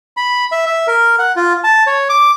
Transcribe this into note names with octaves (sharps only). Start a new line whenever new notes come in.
B5
E5
E5
A#4
F#5
F4
A5
C#5
D6